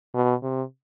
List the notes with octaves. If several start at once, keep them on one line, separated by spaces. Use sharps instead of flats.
B2
C3